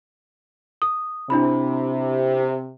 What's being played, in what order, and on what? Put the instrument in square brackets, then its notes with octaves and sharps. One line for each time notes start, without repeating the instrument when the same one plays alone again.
[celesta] D#6
[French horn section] C3 [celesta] D4 E4 B5